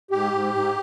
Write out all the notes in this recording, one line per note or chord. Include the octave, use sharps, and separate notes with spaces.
G#2 G4
G#2
G#2